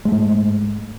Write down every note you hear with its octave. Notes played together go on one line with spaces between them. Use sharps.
G#2 G#3 A3